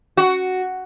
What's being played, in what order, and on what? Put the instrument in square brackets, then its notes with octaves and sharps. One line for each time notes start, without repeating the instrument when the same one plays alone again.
[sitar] F#4